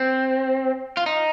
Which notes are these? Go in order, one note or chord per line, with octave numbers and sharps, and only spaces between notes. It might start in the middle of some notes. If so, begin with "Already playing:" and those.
Already playing: C4
F4
D#4